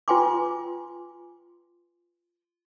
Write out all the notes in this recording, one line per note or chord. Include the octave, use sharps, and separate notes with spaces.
F4 B4 G5 G#5 C6 D6